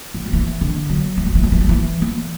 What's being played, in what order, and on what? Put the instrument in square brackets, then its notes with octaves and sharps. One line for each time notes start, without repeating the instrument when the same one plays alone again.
[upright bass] E3
F#3
E3
D3
F#3
E3
F#3
E3
F#3
E3
F#3
E3
E3